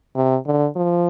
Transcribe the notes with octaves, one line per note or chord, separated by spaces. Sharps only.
C3
D3
F3